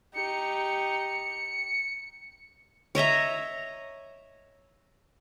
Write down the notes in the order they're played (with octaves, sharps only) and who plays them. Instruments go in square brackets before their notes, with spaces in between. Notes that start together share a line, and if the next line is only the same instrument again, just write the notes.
[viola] D#4 G4 [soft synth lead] C#7
[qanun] C#5 D#5 E5 A#5